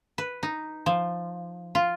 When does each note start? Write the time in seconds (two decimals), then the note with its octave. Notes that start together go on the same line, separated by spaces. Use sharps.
0.18 B4
0.43 D#4
0.86 F3
1.75 F4